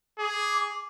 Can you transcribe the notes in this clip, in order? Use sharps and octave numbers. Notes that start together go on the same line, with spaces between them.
G#4 D6